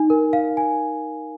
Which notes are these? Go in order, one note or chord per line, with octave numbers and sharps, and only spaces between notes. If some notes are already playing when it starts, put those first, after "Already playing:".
Already playing: D#4 G#5
A#4
F5
G#5